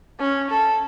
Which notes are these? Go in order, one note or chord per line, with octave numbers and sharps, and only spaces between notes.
C#4
A4